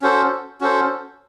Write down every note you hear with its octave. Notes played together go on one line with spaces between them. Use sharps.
C#4 F#4 A4 C5
C#4 F#4 A4 C5